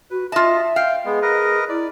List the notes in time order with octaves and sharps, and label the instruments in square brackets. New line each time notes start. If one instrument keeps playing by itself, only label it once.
[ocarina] F#4 [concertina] B4
[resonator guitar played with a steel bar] F4 A5 [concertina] D#5 [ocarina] E5
[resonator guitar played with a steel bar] F5 [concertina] G5
[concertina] G#3 B3 [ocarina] G#4
[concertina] A#4 B4 D#5
[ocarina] E4 [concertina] D5